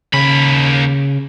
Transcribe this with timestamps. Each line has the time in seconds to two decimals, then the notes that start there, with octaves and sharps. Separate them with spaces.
0.14 D#2 C#3 B5